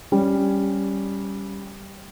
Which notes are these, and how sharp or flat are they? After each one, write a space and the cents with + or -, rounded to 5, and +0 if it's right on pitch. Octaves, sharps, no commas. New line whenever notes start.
G3 +0 C#4 +0